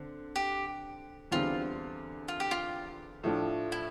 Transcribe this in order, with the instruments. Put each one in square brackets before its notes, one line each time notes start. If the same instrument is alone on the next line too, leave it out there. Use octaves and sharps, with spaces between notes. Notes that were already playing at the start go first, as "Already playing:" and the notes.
Already playing: [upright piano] D3 C4
[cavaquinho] G4
[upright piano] E2 D3 G3 C4 [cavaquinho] F4
[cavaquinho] F4
G4
F4
[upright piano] A2 F3 A3 D4 F4
[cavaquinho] E4